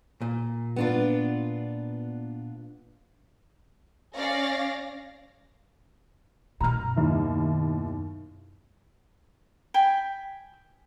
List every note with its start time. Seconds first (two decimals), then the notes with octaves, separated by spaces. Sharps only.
0.21 A#2
0.76 B3 D4 F4
4.15 C#4 D5 F5 A#6
6.61 F#2 B2 A#5 F6
6.96 D#2 E4
9.74 G5 G#5 B5